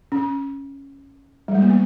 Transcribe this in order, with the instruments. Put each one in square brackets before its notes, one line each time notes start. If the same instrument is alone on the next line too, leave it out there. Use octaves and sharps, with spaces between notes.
[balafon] C#4
G3
G#3
A#3
B3